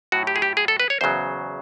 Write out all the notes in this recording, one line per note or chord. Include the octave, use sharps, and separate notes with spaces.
A2 F#3 F#4
G4
G#4
G4
G#4
A4
B4
C#5
E2 C#3 F#3 C5